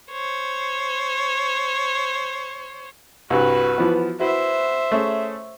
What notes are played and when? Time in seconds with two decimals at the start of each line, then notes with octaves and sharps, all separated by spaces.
0.12 C5 C#5
3.30 C2 G2 F#4 B4
3.78 E3 F3 B3
4.20 E4 F#4 B4 C5 E5
4.92 A3 C#4 G#4